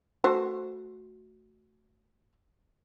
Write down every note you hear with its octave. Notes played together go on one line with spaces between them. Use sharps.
A3 F#4 C5